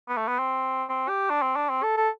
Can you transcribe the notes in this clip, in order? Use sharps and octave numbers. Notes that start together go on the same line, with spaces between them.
B3
A3
B3
C4
C4
G4
D4
C4
D4
C4
A4
A4